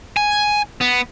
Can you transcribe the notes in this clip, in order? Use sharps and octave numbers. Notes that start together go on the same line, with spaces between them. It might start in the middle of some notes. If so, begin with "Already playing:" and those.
G#5
B3